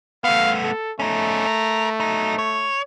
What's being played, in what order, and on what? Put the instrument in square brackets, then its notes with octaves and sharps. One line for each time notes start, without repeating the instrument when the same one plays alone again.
[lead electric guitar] A3 B3 [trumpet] F5
[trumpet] A4
[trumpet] A3 [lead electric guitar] C#4 D#4
[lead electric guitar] A#4
F#3 D#4
C#5